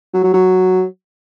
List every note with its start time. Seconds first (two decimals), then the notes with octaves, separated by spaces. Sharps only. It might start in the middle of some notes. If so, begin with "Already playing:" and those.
0.14 F#3
0.24 F#3
0.34 F#3